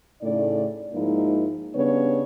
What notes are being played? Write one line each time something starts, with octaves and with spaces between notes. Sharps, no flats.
A2 C#3 A3 D#4 D5
G#2 F3 G#3 A#3 D#4 E4
C#3 G3 B3 D4 B4 C#5